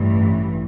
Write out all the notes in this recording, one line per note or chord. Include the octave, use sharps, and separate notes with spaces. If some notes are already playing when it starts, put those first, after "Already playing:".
Already playing: A1 G2 E3